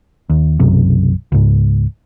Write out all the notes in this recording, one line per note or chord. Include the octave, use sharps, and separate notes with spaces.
D#2
B1 F#2 C3
C#2 G#2